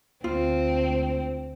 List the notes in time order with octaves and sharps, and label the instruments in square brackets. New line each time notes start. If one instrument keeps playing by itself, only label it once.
[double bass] D2 [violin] C4 [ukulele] F4